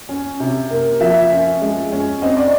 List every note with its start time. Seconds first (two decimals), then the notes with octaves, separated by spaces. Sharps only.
0.09 C#4
0.40 C3
0.70 A#3
1.00 F3 E5
1.31 C#4
1.62 G#3
1.92 C#4
2.22 C4 D#5
2.37 D5